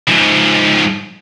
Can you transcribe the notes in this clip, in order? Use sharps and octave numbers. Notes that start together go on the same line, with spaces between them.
G#2 F3